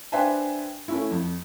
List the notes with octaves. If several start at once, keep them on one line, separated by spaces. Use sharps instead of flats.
D4 B4 C5 E5 G5 G#5
A3 C#4 E4
F2